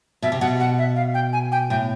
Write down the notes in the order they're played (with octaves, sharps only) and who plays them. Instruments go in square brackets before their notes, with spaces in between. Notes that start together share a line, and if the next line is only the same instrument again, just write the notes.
[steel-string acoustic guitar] B2 [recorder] E5
[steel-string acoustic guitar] C3
[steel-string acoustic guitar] B2 [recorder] F#5
[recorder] F#5
E5
F5
G5
G#5
G5
[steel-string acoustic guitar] A2 [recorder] G5